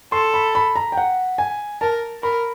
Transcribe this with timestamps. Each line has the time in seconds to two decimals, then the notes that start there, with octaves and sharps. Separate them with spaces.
0.12 A4 C6
0.34 B5
0.55 B5
0.76 A#5
0.92 G5
0.97 F#5
1.38 G#5
1.81 A#4 A5
2.23 A#4 B5